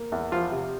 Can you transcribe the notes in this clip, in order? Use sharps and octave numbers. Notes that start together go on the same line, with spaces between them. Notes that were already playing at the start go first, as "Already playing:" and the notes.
Already playing: A#3
E2
F3 F4
C3